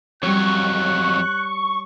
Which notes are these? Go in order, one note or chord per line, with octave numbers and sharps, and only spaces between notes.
F2 F#3 G3 C#5 C#6 F#6